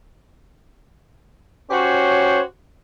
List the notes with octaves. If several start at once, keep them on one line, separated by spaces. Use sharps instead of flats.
C#4 F#4 G4 C5 C#5